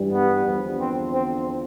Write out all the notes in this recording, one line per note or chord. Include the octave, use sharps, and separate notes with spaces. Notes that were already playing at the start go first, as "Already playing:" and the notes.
Already playing: G2 E3 G3
B3
E2 D3 F3
C4
C4